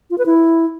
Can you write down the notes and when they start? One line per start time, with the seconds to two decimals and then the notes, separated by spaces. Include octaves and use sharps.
0.10 F4
0.18 B4
0.26 E4